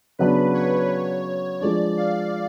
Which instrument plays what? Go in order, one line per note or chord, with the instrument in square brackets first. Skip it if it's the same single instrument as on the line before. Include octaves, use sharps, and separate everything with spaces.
[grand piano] C#3 F#3 B3 D4 [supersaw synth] B4
[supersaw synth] C#5
[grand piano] F3 G#3 D4 [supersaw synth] D5
[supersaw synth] F5